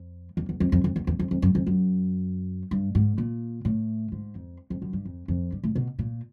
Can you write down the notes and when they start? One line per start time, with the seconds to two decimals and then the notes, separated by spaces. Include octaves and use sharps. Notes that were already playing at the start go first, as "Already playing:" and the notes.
Already playing: F2
0.37 E2
0.49 E2
0.60 F2
0.72 F2
0.84 F2
0.96 E2
1.07 E2
1.19 F2
1.31 F2
1.42 F#2
1.55 F2
1.67 F#2
2.71 G2
2.95 G#2
3.18 A#2
3.65 A2
4.12 G#2
4.35 F2
4.70 F2
4.82 F#2
4.93 G2
5.05 F2
5.28 F2
5.52 G2
5.64 A2
5.75 B2
5.99 A#2